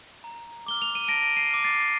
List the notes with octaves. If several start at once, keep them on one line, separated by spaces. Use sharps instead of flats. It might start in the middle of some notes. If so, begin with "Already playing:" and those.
A#5
D6 F6 G7
F7
D#7
A5 A#6 D7
C7 D#7
D6 F6
A6 C7